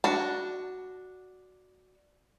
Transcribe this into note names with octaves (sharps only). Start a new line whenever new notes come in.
D4 F#4 A5